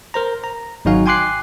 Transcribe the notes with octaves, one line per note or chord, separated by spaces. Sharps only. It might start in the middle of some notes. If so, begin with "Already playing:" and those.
A#4 C5 A#5
A#5
G#1 F#3 D#4 F#4 F5 G#5
G5 G#5 C6 D6 F#6 C7